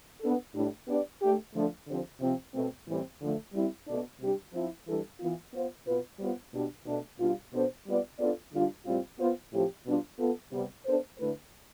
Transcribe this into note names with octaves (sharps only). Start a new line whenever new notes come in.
B3 D4 A4
A2 G3 D4
B3 D4 G4 B4 D5
A3 D4 G4
D3 F3 A3
D3 F3 C4 G4 C5
C3 F3 C4
B2 A3 C4
A2 E3 G3 C4
D3 F3 A3
G3 C4 E4
B2 A3 D4
C3 G3 D4 G4
F3 C4 E4
E3 G3 D4 A4
E3 B3 F4
B3 F4 C5
B2 B3 F4 B4
G3 B3 F4 C5
B2 G3 D4
B2 A3 D4
B2 G3 D4 F4
B2 B3 D4 A4 C5
G3 B3 F4 B4 D5
B3 D4 F4 A4 D5
D3 G3 D4 F4
A2 G3 C4 F4
B3 F4 C5
A2 F3 C4 G4
B2 G3 B3 D4 F4
B3 F4 A4
C3 G3 B3
B3 D4 A4 C5
D3 A3 E4 B4